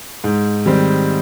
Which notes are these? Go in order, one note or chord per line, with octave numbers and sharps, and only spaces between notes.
G#2
D#3 G3 C4